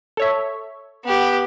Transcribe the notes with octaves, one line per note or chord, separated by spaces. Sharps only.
A4 C#5 E5
B3 G4